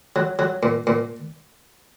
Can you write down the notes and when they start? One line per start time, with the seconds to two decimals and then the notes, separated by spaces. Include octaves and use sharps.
0.16 F#3
0.39 F#3
0.63 A#2
0.87 A#2